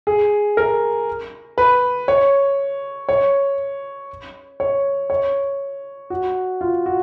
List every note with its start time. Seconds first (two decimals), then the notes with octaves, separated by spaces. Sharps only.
0.07 G#4
0.57 A#4
1.58 B4
2.08 C#5
3.09 C#5
4.60 C#5
5.10 C#5
6.10 F#4
6.61 F4
6.86 F#4